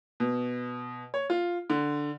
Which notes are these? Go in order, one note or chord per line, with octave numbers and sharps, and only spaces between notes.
B2
C#5
F4
D3